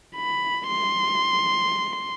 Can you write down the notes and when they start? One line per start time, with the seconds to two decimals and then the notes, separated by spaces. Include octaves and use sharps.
0.16 B5
0.69 C6